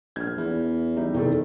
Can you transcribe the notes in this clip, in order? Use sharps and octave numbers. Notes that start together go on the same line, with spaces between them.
A#1 F6 G#6
E2
G3 D#4 E4
E2 C3 D#3 A4